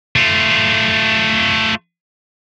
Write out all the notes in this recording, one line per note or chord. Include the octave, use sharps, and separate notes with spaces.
A3 F4